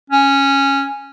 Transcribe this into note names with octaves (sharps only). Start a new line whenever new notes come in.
C#4